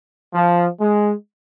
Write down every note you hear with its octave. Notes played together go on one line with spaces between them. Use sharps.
F3
G#3